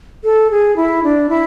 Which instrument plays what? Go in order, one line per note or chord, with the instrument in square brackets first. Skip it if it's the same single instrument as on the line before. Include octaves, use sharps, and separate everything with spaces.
[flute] A4
G#4
E4
D4
E4